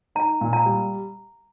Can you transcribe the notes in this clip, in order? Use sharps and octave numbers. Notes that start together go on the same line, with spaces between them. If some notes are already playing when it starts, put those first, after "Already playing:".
D#4 A#5
A#2
A#5
G3